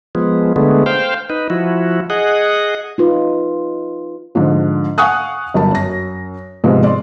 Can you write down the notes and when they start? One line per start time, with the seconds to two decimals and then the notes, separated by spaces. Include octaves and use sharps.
0.15 F3 G#3 B3
0.56 D3 G#3 A3 B3
0.86 C5 F5 G5
1.30 D#4 B4
1.50 F3 E4 F#4
2.10 G#4 D#5 F#5
2.98 D#4 F4 B4
4.35 G#2 D3 F3
4.98 F5 F#5 G#5 C#6 D#6 F#6
5.54 G1 F#3 A#4 A5
5.72 F#2 A#6
6.64 G#2 C3 F3 G#3 B3
6.83 D5 C6